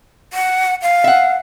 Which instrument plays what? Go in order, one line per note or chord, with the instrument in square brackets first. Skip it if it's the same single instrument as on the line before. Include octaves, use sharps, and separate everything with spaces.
[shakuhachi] F#5
F5
[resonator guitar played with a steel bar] E5 F#5